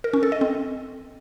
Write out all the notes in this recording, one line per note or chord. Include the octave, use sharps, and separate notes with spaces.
A#4
C#4
A4
D#5
C4